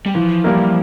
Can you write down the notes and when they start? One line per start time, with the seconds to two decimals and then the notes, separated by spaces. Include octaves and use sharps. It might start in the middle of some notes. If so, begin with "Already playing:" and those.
0.06 G3
0.14 E3 F3
0.44 G3 A#3 E4 A#4